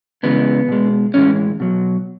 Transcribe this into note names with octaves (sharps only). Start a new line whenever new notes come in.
C#3 E3 G#3 B3
B2 G#3
A2 E3 G#3 C#4
B2 F#3